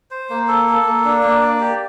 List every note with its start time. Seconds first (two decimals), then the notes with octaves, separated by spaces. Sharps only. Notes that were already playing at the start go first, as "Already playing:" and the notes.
0.11 C5
0.30 A#3
0.48 A4
0.68 A4
0.85 A#3
1.05 D4
1.23 A#3
1.42 D5
1.60 G4